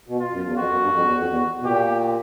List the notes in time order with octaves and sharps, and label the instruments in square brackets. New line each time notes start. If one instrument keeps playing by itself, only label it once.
[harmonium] B2
[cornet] F4
[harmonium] F#2
E2
[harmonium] F2 [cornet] F#4
[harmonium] F#2
G2
F2
E2
F2
E2
B2
[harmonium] A#2 [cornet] G4